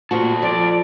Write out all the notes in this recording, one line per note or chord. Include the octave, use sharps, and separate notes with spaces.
A#2 F#4 A4 C5 A5
F3 D5